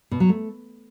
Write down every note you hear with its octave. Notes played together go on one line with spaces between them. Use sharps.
B2
F#3
A3